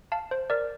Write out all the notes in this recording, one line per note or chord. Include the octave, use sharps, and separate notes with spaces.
F5 A5
C5
A#4 D5